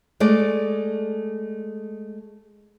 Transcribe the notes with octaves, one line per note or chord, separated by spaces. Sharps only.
G#3 A3 G#4 D5